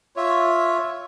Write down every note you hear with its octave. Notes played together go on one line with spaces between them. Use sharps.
F4 C#5 E5